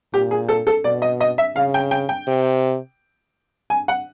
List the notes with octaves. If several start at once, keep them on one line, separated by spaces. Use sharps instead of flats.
A#2 G4
G#4
A4
A4
B2 D5
D#5
D#5
E5
C#3 F5
G5
G5
G5
C3
G#5
F#5